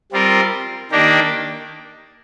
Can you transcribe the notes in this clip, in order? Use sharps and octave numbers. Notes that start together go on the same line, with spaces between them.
G3 C4 F4 A#4
D#3 A#3 D4 G4 A#4